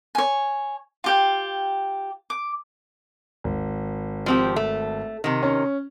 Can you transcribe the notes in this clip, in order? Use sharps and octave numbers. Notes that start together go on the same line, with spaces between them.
C#5 G#5
F4 G4 G5
D6
G#1
F3 C4 G4
A3
C3 D#3
C#4